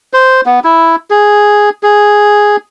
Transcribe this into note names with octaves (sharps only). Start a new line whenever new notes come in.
C5
B3
E4
G#4
G#4